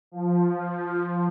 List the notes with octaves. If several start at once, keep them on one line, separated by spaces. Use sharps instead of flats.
F3